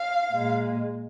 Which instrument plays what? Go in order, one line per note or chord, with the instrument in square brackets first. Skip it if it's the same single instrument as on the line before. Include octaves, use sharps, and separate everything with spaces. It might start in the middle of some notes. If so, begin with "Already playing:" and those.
Already playing: [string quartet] F5
A#2 G#3